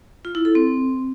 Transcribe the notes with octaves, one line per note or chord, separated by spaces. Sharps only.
F4
E4
A4
C4